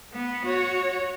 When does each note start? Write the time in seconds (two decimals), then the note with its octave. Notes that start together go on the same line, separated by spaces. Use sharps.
0.13 B3
0.45 F#4 C#5